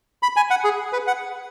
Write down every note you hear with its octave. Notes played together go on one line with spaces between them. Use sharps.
B5
G#5
F#5
G#4
B4
F#5